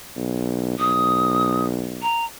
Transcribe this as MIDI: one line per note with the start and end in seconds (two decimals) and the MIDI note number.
0.16 0.77 35
0.79 2.03 35
0.79 1.65 87
2.02 2.25 82